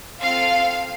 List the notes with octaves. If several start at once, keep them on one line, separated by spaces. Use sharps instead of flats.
C4 F4 A4 F5